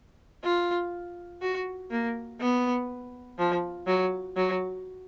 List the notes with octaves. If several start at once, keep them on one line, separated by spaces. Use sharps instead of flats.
F4
F#4
A#3
B3
F3
F#3
F#3